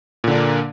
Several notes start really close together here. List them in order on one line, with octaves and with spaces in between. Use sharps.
A#2 D3 D4 A#3